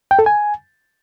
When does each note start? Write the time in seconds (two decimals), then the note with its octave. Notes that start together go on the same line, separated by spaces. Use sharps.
0.11 G5
0.19 A4
0.26 G#5